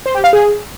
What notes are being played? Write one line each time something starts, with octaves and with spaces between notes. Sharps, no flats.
C5
G4
F5
G#4